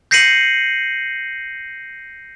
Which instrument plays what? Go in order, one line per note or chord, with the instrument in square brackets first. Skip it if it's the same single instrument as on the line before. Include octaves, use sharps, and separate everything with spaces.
[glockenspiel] G6 A#6 C7 C#7 D#7 F#7